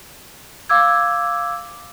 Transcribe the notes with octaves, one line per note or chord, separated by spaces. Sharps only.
F5 D6 E6 G#6